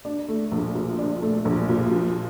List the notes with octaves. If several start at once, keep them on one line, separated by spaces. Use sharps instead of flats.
D4
A3
A#1
A#2
D4
A3
A#1
A#2
F3